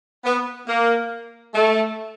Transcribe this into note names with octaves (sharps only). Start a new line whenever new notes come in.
B3
A#3
A3